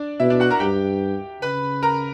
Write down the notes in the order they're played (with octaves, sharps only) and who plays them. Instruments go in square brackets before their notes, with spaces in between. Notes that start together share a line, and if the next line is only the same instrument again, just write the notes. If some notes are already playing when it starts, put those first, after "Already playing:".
Already playing: [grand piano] D4 D5
[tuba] B2 [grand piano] E4 E5
[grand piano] D4 D5
F#4 F#5
A#4 A#5
[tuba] G2 [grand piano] G4 G5
[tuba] C#3 [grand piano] B4 B5
[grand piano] A#4 A#5